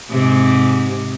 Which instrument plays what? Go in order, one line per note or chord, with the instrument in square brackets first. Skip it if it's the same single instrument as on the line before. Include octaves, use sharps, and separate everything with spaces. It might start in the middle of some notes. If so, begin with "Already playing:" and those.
[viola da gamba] G#2 C3